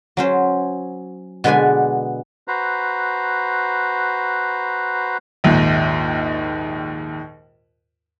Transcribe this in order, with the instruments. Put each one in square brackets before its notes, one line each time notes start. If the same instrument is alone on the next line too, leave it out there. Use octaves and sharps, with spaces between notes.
[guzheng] F#3 C#4 C5
B2 D3 G#3 B4 D5 G#5
[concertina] F#4 B4 C5 A#5
[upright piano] A#1 D#2 G#2